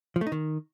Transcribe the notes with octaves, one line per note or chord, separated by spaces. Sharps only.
F3
A3
D#4
D#3